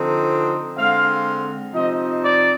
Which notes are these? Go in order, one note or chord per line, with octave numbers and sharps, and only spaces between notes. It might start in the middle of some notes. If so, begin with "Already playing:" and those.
Already playing: D3 F3 C4 D#4
D3 G#3 C4 F5
C3 F3 C4 D#4 D#5
D5